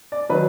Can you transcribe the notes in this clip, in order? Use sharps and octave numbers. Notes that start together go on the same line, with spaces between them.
D5
D#3 F#3 B4